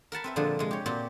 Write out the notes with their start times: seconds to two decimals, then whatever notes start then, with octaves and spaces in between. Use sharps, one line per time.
0.12 A#4 F#5 A5 B5
0.24 C4 B4 E5
0.36 A#2 D3 F3 G#3
0.59 C3 G#3
0.71 G4 C#5
0.86 A#2 C4 F#4 G4